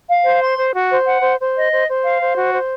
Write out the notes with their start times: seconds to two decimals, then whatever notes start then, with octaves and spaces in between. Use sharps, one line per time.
0.09 F5
0.25 C5
0.42 C6
0.57 C5
0.74 F#4
0.91 C5
1.07 F#5
1.22 C5
1.40 C5
1.56 D#5
1.71 C5
1.88 C5
2.04 F5
2.20 C5
2.37 F#4
2.53 C5